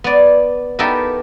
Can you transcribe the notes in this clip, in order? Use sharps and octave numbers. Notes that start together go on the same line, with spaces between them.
B3 D5
B3 D#4 E4 G4 A4 A#4